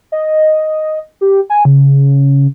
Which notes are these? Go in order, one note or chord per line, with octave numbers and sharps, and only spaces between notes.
D#5
G4
G#5
C#3